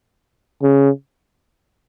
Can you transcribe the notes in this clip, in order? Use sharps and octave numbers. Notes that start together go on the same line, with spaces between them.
C#3